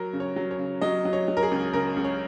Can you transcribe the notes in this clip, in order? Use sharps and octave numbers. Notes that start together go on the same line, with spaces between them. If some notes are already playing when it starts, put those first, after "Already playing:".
Already playing: F#3 A#4
C#3
C#5
F#3
C#5
C#3
F#3 D#5
F#3
C#5
F#3
A#4
G#4
C#2
C#3 A#4
C#2
C#5